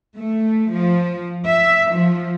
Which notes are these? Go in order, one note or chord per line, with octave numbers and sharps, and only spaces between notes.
A3
F3
E5
F3